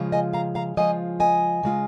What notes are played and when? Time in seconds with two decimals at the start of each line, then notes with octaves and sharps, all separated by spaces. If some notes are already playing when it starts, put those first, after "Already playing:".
Already playing: C#3 F3 G#3 F4
0.12 D#5 G#5
0.33 F5 A#5
0.55 F5 A#5
0.77 C#3 F3 G#3 F4 D#5 G#5
1.20 D#5 G#5
1.63 C#3 G#3 F4